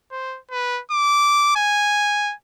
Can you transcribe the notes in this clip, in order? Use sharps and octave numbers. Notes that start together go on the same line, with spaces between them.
C5
B4
D6
G#5